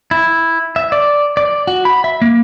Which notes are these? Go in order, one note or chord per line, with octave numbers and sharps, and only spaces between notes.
E4
E5
D5
D5
F#4
B5
E5
A#3